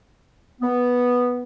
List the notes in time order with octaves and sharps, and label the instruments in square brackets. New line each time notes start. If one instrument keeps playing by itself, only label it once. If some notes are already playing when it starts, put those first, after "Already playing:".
[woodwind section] B3